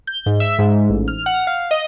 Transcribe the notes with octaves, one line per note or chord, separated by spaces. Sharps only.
G6
G#2
E5
G#2
A1
F6
F#5
F5
D#5